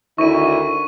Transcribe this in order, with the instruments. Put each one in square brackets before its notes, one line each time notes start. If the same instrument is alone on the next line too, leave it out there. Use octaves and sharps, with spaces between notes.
[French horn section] D2 D#3 [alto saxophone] E4 [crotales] C#6 D#7